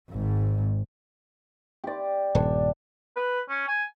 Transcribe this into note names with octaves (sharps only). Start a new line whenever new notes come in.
G#1 G#2
G4 D5
D#1 G2 D4
B4
C#4
G#5